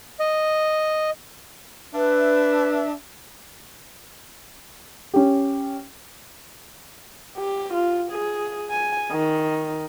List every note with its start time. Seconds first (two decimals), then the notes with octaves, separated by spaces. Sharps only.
0.20 D#5
1.95 D4 B4 E5
5.14 C#4 G4
7.37 G4
7.74 F4
8.12 G#4
8.71 G#5
9.12 D#3